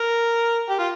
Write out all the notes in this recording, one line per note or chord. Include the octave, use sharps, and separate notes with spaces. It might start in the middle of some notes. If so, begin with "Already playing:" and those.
Already playing: A#4
G4
F4